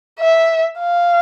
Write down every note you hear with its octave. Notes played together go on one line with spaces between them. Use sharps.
E5
F5